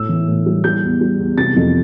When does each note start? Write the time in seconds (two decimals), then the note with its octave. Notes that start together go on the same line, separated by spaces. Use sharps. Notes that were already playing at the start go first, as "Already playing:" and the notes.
Already playing: A2 E6
0.09 E3
0.28 A2
0.46 G3
0.64 G3 G6
0.83 E2
1.01 G3
1.19 E2
1.37 C3 A6
1.56 F2